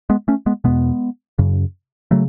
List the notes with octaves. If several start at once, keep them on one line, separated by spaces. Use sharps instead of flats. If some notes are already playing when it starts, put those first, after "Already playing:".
G#3 B3
A3 C#4
G#3 B3
E2 B2 G#3 B3
F#2 C#3
C#3 F#3 A3